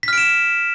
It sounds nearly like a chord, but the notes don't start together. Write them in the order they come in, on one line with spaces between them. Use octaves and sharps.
B6 F6 D7 E7